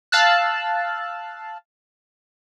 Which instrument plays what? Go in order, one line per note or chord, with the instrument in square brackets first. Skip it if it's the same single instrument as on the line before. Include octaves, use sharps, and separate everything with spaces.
[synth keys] F5 A5 E6 F#6